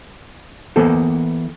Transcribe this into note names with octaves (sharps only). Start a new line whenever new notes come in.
E3 A#3 B3 A4 C5